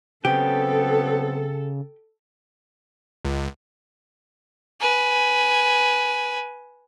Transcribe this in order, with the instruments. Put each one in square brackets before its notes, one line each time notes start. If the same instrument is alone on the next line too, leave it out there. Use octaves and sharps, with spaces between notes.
[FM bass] C#3 [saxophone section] F#3 B3 C4 [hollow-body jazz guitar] G4 [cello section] A4
[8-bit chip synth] C#2
[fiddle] B4 G#5